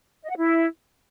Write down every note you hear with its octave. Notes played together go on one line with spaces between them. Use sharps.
D#5
F#5
E4